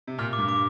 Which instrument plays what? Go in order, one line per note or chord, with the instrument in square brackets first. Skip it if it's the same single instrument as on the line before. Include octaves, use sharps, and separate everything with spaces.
[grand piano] C3
[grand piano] A#2 [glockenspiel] F6
[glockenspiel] D6
[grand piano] G2
[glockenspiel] D6